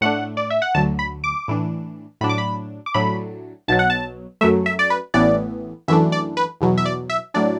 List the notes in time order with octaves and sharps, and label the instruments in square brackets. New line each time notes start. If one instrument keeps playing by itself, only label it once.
[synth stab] A2 A3 D4 F#5
D5
E5
F#5
D2 D3 F#3 A5
B5
D6
A2 E3 D4
A2 F#3 D4 B5
D6
B5
D6
A2 F#3 A3 D4 B5
B1 B2 F#3 A5
F#5
A5
F#2 F#3 A3 E5
E5
D5
B4
A1 A2 E3 B3 D5
F#2 E3 A3 D4 E5
D5
B4
E2 B2 F#3
E5
D5
E5
A2 F#3 D4 D5